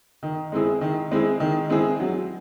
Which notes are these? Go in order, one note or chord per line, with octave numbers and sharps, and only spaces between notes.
D#3
G#3 C4 E4 G#4
D#3
G#3 C4 E4 G#4
D#3
G#3 C4 E4 G#4
F#3